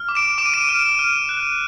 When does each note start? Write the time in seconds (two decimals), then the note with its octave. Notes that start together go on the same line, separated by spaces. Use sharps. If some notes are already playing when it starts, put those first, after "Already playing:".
Already playing: F6
0.09 D6
0.15 D7 E7
0.38 D6 E7
0.46 D#7
0.54 D7 E7
0.69 F6
0.99 F6
1.29 F#6